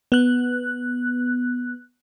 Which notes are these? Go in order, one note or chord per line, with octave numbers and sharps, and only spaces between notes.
B3 F#6